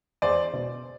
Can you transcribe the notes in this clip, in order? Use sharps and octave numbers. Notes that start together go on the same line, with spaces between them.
E2 C5 D5
B2